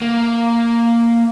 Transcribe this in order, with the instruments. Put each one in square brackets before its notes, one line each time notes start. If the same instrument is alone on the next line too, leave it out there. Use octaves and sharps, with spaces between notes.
[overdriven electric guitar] A#3